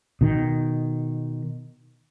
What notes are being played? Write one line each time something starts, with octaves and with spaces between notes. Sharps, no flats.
B2 D#3